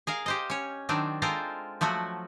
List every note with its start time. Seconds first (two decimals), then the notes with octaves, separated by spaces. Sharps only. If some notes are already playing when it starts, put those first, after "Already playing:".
0.07 G#4 A#4 F5
0.26 G4 C5 D#5
0.50 C#4 C#5
0.89 D#3 F#3 C4 D4
1.22 G#3 F4 A4 A#4 C5 G5
1.81 F3 F#3 A3 F#4